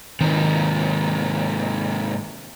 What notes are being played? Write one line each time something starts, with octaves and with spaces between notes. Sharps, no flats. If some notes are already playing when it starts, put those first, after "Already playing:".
G#2 C3 D#3